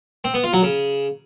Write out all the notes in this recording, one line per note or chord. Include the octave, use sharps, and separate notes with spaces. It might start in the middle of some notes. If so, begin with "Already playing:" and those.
C4
B3
F4
F#3
C#3